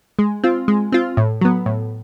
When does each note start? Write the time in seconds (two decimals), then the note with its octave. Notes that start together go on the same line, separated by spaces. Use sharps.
0.19 G#3
0.44 C4 F4
0.68 G#3
0.92 C4 F4
1.17 A2
1.41 F#3 B3
1.66 A2